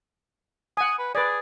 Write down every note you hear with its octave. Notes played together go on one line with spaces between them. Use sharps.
F#5 G#5 D#6
B4
G#4 B4 D5